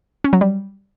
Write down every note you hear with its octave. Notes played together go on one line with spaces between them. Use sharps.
C#4
F#3
G3